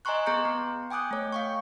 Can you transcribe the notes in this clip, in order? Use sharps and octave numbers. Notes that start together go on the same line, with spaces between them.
D#5 G#5 A#5 C6 C#6 F#6
B3 G#4 A#5 C6 G6 C#7
B3
G5 G#5 D6 D#6 F#6 G6
A3 C#5
F5 G5 C#6